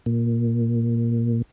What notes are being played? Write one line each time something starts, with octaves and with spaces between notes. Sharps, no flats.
A#2